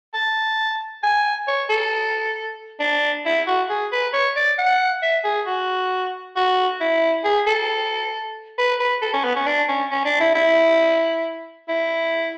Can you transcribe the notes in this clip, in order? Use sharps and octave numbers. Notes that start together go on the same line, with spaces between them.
A5
G#5
C#5
A4
D4
E4
F#4
G#4
B4
C#5
D5
F#5
E5
G#4
F#4
F#4
E4
G#4
A4
B4
B4
A4
C#4
B3
C#4
D4
C#4
C#4
D4
E4
E4
E4